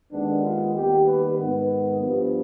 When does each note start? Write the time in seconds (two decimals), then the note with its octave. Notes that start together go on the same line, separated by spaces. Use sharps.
0.11 D#2 D#3 G#3 B3 D4
0.43 F4
0.74 D#2 D#3 G3 B3 G4
1.06 B4
1.38 G#2 D#3 B3
2.00 G2 F3 B3